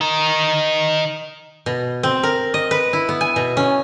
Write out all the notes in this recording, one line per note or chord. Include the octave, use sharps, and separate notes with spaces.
D#3 D#4
B2
C4
A#4
D#5
B4
E4
B3
G#5
B2
C#4